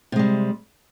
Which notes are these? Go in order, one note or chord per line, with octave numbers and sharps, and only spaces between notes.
C3 G3 G#3